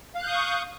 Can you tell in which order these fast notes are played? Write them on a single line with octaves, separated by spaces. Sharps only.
F5 F#6 G6 D#6 C#6